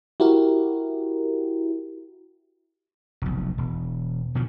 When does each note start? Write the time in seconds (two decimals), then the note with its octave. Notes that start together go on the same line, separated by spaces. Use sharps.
0.20 E4 F#4 G4 A#4
3.22 F1 B1
3.58 E1
4.35 B2 D3 D#3 F3